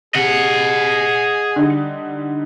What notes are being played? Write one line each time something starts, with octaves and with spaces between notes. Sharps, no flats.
C3 G#4 D#5 F#5
D3 G3 D#4